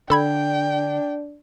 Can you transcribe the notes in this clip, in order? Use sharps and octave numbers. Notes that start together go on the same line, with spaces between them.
D3 D4 A4 G5 B5 G#6